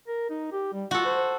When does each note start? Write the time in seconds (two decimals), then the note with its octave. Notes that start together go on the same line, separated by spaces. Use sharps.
0.08 A#4
0.30 D#4
0.52 G4
0.73 G3
0.91 F4 F#4 A4
1.05 C5